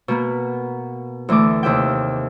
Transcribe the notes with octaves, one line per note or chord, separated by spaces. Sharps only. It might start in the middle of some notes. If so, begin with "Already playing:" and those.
B2 A#3 B3
D2 E3 A3 D6
D#2 C3 E5 G5